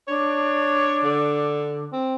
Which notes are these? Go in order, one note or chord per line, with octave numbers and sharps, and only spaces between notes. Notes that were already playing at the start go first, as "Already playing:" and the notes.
D4 C#5
D3
C4